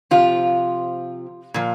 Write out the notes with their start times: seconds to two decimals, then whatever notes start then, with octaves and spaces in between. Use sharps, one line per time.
0.11 C3 F3 F4
1.54 A#2 F3